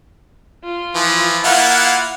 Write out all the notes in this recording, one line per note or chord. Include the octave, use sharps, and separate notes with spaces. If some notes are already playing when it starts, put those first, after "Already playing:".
F4
E3 F3
A#3 E4 F4 F#5